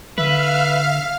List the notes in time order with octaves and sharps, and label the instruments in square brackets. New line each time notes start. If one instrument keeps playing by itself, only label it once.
[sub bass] D3 [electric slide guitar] B4 [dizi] E5 [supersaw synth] F5 F6